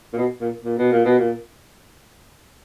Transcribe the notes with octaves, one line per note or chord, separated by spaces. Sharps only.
A#2
B2
A#2
A#2
B2
A#2
B2
A#2